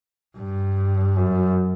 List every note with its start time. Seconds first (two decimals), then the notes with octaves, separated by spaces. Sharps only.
0.37 G2
1.17 F#2